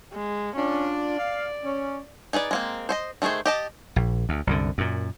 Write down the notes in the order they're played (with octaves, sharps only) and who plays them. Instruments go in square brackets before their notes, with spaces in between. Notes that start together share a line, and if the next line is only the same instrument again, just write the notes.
[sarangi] G#3
[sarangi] C#4 [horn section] D4 F4
[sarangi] D5
[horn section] F5
C#4
[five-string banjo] D#4 G#4 B4 D5
G#3 A#3 C4
C5 C#5 D#5
D#3 A3 B3 G#4 C5
G4 D#5 A5
[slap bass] A#1
D2
C2 F#2 D3
F#2 A#2